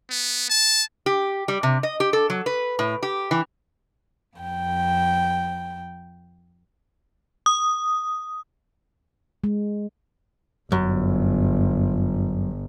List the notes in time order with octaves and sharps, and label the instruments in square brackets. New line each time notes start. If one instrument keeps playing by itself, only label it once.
[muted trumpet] B3
A5
[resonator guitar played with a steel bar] G4
G3
C3
D#5
G4
A4
F#3
B4
A2
G4
E3
[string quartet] F2 G5
[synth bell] D#6
[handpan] G#3
[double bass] G1 [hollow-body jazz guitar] F#2